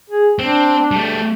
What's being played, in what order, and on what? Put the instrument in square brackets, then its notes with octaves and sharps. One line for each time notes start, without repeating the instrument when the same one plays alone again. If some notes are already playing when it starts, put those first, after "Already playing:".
[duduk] G#4
[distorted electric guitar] C4 [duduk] D4
[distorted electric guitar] G3 A3